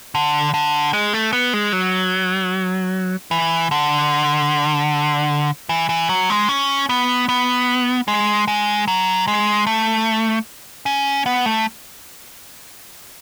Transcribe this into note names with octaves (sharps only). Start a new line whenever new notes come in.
D3
D3
G#3
A3
B3
G#3
F#3
E3
D3
E3
E3
F#3
G#3
C#4
B3
B3
G#3
G#3
F#3
G#3
A3
C#4
B3
A3